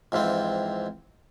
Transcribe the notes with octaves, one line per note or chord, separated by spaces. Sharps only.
F2 G#2 E3 C4